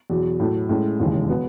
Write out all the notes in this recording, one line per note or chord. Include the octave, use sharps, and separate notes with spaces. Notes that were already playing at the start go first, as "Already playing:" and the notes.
E2 B2 F#3
A2 F#3 A3
A2 G#3 C#4
E1 D#2 C#3 E3 G#3
B2 F#3 B3